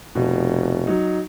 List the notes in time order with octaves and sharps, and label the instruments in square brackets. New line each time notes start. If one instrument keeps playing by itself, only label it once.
[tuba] F1 [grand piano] B2
[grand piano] F#3 D#4